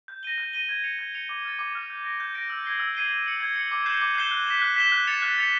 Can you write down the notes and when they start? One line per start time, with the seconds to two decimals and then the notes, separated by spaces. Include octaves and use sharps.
0.08 G6
0.23 A#6 D#7 G7
0.38 G6
0.53 A#6 D#7 G7
0.69 G#6
0.84 C#7 F7
0.99 G#6
1.14 C#7 F7
1.29 D6
1.45 F6 A6
1.59 D6
1.74 F6 A6
1.90 G6
2.04 A#6 D7
2.20 G6
2.35 A#6 D7
2.50 E6
2.65 G#6 C7 D#7 G7
2.80 E6
2.95 G#6 C7 D#7 G7
3.11 G#6
3.26 C#7 F#7
3.41 G#6
3.56 C#7 F#7
3.72 D6
3.86 G6 C7 E7 G7
4.01 D6
4.16 G6 C7 E7 G7
4.31 F#6
4.47 B6 E7 G7
4.62 F#6
4.76 B6 E7 G7
4.92 F#6
5.07 A6 C#7 F7
5.22 F#6
5.37 A6 C#7 F7